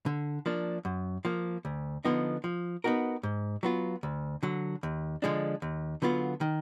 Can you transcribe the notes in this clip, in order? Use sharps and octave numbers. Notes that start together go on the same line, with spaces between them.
D3
F3 A#3 D4
F#2
F3 A#3
D2
D3 F3 B3 D#4
F3
B3 D#4 F#4 A#4
G#2
F#3 B3 F4
D2
D3 F#3
D#2
D3 F3 G#3 D4
D#2
D3 F#3 B3 F4
D#3